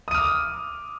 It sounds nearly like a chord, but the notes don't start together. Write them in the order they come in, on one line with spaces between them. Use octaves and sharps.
D#6 D#7 F6 D6